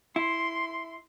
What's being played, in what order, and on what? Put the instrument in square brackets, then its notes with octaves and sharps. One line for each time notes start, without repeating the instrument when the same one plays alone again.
[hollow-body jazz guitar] E4 [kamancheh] C6